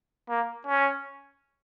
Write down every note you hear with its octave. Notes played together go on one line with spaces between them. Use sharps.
A#3
C#4